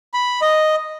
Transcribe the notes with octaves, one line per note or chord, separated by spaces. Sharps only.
B5
D#5